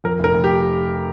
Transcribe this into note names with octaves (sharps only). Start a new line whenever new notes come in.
F2 A#4
F1 A#4
F1
G4